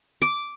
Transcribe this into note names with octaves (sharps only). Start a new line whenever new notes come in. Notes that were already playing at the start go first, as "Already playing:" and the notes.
D6